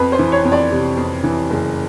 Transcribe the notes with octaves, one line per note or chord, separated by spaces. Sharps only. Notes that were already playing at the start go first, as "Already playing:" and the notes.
Already playing: F2 B4
C5
E3
C#5
F2
D5
C3
F2
E3
F#1